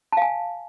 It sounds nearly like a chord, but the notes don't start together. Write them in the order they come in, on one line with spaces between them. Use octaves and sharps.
A5 F5 G#5